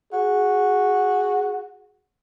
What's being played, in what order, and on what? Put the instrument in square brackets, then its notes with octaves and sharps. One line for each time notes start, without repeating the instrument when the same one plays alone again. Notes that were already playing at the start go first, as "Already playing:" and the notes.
[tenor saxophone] F#4 [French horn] G#4